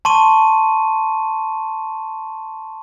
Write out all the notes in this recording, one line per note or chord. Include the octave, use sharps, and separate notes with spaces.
A5 C6 C#6 D#7